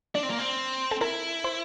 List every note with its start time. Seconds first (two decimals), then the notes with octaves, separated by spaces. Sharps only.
0.15 D4 D5
0.23 C4
0.30 A#3
0.39 C4
0.91 A4
1.01 E4 A#4
1.44 C5